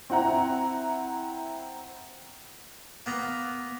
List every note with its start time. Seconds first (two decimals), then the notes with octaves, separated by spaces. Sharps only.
0.10 C4 E4 F#5 A#5
3.06 A#3 B3 A#5